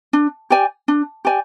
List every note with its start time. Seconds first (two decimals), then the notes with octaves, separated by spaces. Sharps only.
0.13 D4
0.50 G4 D5 G#5
0.88 D4
1.25 G4 D5 G#5